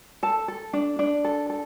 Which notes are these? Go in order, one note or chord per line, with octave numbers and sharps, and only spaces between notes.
A4 A5
A4
D4
D4
A4
A4